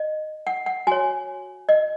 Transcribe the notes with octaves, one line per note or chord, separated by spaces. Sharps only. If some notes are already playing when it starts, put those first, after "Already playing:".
Already playing: D#5
F#5
F#5
F#4 C#5 G#5
D#5